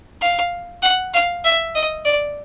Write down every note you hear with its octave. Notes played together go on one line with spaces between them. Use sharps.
F5
F#5
F5
E5
D#5
D5